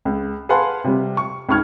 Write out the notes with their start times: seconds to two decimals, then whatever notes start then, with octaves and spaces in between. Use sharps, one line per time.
0.05 C#2
0.49 G#4 B4 F5 F#5 A5 C6
0.84 C3 G3
1.17 C#6
1.49 C#2 G#2 C#6 F6 G#6